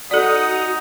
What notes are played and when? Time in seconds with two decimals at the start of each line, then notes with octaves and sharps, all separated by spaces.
0.11 D#4 F#4 A4 D5 F#5 D#6